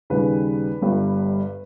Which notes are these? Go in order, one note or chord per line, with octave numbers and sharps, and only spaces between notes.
D#2 C#3 G3 B4
G1 G2 G3